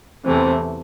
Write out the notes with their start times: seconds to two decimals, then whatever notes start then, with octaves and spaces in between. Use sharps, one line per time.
0.25 E2 C3 E3 A3 C4